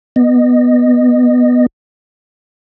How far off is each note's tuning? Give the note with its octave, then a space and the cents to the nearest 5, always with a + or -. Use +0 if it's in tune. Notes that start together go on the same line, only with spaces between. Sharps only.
B3 +0 D#5 -20